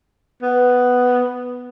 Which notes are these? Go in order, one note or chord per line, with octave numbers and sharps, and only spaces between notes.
B3